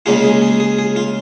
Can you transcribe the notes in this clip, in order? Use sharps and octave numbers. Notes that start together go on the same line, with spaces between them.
C#2 C#3 A#3 F4 G#4
G#4
G#4
G#4
G#4
F4